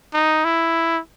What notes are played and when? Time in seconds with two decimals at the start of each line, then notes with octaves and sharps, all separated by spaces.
0.14 D#4
0.44 E4